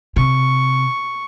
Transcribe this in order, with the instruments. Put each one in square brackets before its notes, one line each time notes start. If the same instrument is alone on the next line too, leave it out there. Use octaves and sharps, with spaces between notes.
[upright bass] C3 [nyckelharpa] C#6